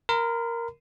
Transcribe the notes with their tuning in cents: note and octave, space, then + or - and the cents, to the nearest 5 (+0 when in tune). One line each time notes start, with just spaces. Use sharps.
A#4 +0 B5 +45